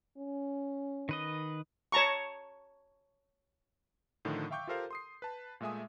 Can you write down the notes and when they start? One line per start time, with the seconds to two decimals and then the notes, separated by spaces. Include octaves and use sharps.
0.18 C#4
1.09 D#3 B4 D#5
1.92 C#5 A5 A#5 C#6
4.25 A2 D3 D#3 F3
4.51 E5 F5 G5 C#6 D6 G6
4.68 F4 G4 A4 A#4 C5 F5
4.91 C6 D#6 C7
5.22 B4 A5
5.61 A#2 G#3 A3 E5 G#5 D#6